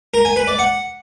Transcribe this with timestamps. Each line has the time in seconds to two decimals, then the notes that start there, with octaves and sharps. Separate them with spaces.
0.14 A#4
0.25 G#5
0.36 B4
0.47 D5
0.59 F#5